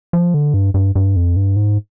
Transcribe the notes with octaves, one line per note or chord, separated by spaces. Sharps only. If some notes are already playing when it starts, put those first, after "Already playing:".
F3
D3
G2
G2
G2
F2
G2
G#2